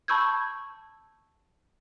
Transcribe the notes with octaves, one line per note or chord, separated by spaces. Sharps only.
A5 B5 C#6 E6 G6 G#6